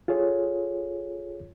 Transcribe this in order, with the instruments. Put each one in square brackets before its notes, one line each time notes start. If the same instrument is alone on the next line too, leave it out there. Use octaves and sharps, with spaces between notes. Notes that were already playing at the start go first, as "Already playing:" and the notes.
[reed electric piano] F4 G#4 A4 C#5